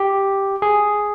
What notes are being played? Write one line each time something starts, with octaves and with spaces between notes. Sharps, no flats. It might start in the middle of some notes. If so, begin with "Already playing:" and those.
Already playing: G4
G#4